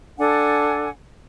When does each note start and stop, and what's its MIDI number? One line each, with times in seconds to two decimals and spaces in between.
0.18 0.89 62
0.18 0.89 69
0.18 0.89 78
0.18 0.89 80